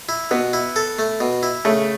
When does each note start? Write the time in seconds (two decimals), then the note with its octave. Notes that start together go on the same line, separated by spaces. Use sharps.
0.09 E4
0.31 B2 B3
0.53 E4
0.76 A4
0.99 A3
1.20 B2
1.43 E4
1.65 C#3 A3